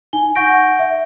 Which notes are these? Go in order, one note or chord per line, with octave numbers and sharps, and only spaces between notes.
D#4 G#5 G7
F#5 G#5 C#6 G6 A#6 D7
E5